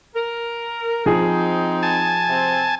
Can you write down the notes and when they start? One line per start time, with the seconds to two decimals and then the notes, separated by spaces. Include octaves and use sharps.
0.15 A#4
1.06 F3 C4 D#4 G#4
1.83 G#5 A5
2.29 C3 C4